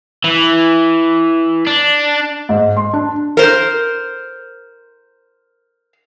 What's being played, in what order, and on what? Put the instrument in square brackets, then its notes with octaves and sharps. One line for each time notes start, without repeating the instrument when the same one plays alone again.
[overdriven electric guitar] E3
D4
[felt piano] G#2
C6
D4
[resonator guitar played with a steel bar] A#4 C5